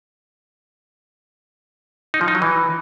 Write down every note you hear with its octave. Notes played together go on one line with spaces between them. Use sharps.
D#4
F3
D#4
F#3
E3